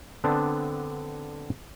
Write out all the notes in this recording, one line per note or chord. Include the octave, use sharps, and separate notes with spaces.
D3 B3 C4 D4